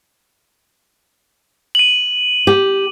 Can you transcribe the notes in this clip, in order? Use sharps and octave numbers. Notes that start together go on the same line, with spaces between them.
D#7 F#7
G4